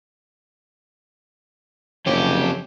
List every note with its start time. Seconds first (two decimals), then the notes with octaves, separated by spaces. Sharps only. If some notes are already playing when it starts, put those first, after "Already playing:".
2.06 F#1 F2 G4 C#5